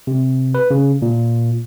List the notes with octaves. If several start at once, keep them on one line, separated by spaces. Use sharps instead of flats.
C3
B4
C#3
A#2